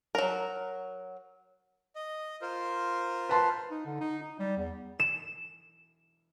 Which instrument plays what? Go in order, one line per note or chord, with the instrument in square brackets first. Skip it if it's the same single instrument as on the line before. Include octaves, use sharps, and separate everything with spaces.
[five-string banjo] F#3 A#4
[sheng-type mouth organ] D#5
F4 A#4 C5
[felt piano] B4 A5 C6
[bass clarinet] D#4
D3
D#4
D#4
G3
E2
[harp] E7